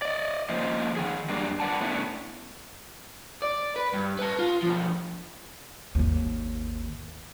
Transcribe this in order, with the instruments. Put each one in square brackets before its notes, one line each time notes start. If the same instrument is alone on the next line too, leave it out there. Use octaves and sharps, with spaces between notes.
[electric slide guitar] D5 D#5
F3 A#3 C#4 C5 D#5
D#3 G#4
F#2 G3 A#3 D4
B4 D5 F#5 A5
A2 A3 B3 C#4 D4 E4
[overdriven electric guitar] D5
B4
G2
B4 A5
F4
B2 F3
[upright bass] G#1 D#2